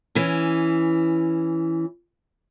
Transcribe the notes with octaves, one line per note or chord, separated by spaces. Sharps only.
E3 C#4